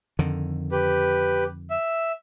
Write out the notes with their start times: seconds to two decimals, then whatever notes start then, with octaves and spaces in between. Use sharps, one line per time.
0.19 F2 D3 D#3
0.72 G4 B4
1.70 E5